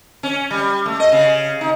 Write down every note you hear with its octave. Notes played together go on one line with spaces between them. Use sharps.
C#4
G3
A3
D#5
C#3
D#4